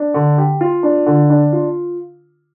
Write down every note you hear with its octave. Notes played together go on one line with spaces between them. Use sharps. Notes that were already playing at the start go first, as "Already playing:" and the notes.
Already playing: D4
D3
G4
F4
D4
D3
D4
F4